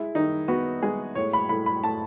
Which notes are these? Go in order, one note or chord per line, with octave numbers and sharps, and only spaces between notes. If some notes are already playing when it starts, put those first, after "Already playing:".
Already playing: G#3 E4
D#3 D#4
B3 F#4
G#3 G#4
A2 C#5
B5
A2 B5
B5
A2 A5